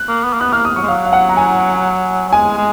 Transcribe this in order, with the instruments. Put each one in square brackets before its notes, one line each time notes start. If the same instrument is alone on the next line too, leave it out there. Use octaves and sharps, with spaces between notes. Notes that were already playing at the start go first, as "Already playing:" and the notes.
Already playing: [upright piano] F#6
[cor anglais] A#3
B3
A#3
[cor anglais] B3 [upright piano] F#6
[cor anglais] A#3 [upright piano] F6
[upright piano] D#6
[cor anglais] F#3 [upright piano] C#6
[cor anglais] G#3
[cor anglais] F#3 [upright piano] F5
[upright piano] F5
F#5
A#5
G#5
[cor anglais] F#3
[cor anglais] G#3 [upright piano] G#5
[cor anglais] G#3